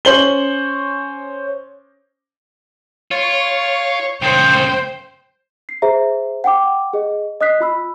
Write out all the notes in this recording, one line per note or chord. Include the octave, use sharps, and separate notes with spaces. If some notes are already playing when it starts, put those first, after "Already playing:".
C#4 C5 F#7 G7
F4 C#5
A#2 C#3 C5 G5
C7
G#4 C5 E5 A#5
F#5 G5 D6
G#4 D#5
D#5 D#6 F#6 B6 C7
F4 B5 E6